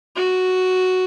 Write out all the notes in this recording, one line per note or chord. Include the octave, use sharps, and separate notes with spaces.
F#4